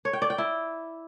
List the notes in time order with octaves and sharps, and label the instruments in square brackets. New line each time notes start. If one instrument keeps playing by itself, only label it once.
[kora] C#5
G5
D5
G5
E4